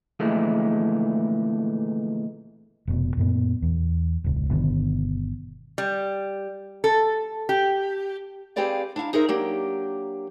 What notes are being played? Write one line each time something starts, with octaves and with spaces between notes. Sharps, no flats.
F2 A#2 D3 E3 G#3 A3
F1 B2
F#2 A#2 B3
E2
E1 C#2
G1 B2 D3 D#3
G3
A4
G4
C4 G4 G#4 B4 D5 F5
D4 E4 F5 A#5
D#4 G#4 A#4 C5 E5
F#3 A#3 D4 G4